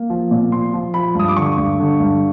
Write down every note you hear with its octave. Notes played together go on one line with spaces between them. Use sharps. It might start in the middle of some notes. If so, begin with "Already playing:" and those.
Already playing: A#3
F3
A#2
F3 C6
F3
F3 B5
G2 D#6
D6
D3 C#6
G2
D3
G2